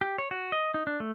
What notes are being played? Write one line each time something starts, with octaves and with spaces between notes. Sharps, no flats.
G4
C#5
F#4
D#5
D#4
D4
A3